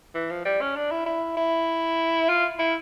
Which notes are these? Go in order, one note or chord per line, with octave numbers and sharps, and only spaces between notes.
E3
F3
G3
C#4
D4
E4
E4
E4
F4
E4